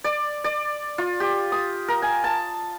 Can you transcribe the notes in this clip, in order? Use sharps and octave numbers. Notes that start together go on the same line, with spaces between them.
D5
D5
F4
G4
D#6
A#4
G#5
A5